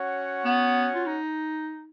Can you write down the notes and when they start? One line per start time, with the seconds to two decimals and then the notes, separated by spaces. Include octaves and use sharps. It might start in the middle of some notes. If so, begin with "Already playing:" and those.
Already playing: C#4 F#4 C#5 F#5
0.45 B3
0.95 F4
1.06 D#4